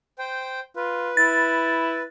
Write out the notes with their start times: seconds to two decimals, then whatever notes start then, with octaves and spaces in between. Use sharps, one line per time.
0.18 C5 G5
0.76 F4 B4
1.17 E4 A6